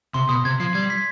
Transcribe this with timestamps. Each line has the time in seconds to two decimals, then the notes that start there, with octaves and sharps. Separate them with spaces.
0.14 C3 C6
0.29 B2 D#6
0.45 C3 G#6
0.60 F3 C7
0.75 G3 G#6
0.90 B6